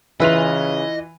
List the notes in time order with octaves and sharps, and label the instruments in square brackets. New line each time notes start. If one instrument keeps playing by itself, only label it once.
[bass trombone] C#3 [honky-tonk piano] E3 F7 [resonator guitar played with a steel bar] F4 B4 E5 [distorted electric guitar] D#5